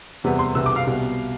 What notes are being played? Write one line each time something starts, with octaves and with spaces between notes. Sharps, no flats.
E2 C3 G3 B3
C6
C2 B2 G3 B3 E6
D6
F5
C2 B2 G3 B3